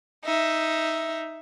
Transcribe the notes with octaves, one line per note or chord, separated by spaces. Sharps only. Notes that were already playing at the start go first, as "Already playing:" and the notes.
D#4 E5